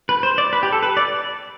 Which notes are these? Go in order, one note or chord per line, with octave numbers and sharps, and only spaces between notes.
B4
C5
D5
B4
G4
A4
B4
D5